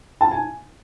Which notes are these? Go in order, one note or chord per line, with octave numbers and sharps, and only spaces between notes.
A5
G#5